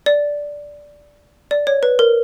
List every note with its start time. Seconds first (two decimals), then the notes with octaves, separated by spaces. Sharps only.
0.06 D5
1.51 D5
1.67 C#5
1.83 B4
1.99 A#4